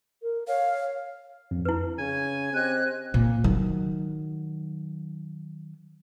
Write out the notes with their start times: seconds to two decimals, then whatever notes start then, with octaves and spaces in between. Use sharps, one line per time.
0.22 A#4
0.48 C#5 F5
1.51 F2
1.65 E4 B4
1.98 C#3 G#5
2.53 C4 G4 D#5 F#6
3.14 A#2
3.44 D#3 F#3